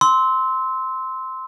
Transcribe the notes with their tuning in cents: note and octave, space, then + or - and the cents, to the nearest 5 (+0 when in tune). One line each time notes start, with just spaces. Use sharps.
C6 -5 E6 -25